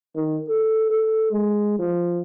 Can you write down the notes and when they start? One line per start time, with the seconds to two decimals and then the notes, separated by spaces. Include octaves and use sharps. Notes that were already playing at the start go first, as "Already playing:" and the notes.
0.15 D#3
0.49 A4
0.90 A4
1.31 G#3
1.79 F3